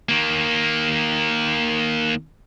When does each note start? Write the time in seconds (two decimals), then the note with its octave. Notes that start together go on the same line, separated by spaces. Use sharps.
0.09 D#3 A#3